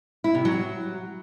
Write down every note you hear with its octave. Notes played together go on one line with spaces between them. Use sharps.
E4
C3
F#3